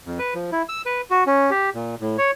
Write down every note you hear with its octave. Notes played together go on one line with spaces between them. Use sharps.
F2
B4
F3
E4
E6
B4
F#4
C#4
G4
A#2
A2
C#5